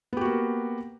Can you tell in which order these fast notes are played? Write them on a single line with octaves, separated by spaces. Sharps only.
B3 G4 F#4 A#3